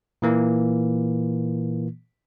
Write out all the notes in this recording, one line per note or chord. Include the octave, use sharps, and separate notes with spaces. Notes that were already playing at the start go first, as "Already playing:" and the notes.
A#2 E3 A#3